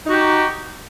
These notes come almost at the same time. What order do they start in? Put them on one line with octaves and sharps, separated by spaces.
D#4 F#4 G4